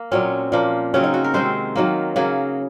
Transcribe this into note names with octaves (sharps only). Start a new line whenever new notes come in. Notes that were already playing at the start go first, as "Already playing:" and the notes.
Already playing: A#3
A#2 F#3 C4 C#4
A#2 F3 A#3
C#3 F#3 C4 C#4
D#4
F#4
A#4
C3 D#3 G#3 C4 C5
D#3 F#3 A#3
C#3 F#3 A#3 G#4